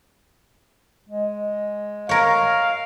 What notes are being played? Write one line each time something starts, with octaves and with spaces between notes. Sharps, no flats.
G#3
A#4 C#5 F5